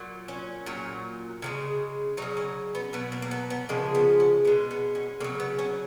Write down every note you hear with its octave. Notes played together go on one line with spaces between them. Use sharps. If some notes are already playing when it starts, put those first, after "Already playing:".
Already playing: A#2 F#3
C#4
A#2 F#3
C#3 F3 G#3
C#3 F#3 D#4
C#4
B3
B2 F#3 B3
A#3
A#3
B3
B3
C#3 F3 G#3 A#3
B3
C#4
B2 G#3 B3
B3
C#4
C#3 F#3 A#3
B3
C#4